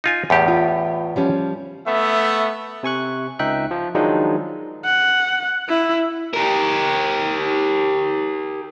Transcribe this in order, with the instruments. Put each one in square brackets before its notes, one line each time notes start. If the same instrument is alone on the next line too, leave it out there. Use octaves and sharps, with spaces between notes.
[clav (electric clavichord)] D#4 F4 G#5
E2 A2 G4
[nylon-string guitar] F4
F3 G3 C#4
[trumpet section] A3 B3 E5
[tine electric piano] C3 G#5 C#6 F#6
C#2 D#4 E5 G5 F#6
F3
D#3 F3 F#3 G#3 D4 D#4
[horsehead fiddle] F#5
E4
[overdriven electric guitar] G4 A#4